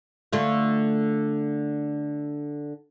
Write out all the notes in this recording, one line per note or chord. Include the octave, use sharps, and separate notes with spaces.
D3 A3 F4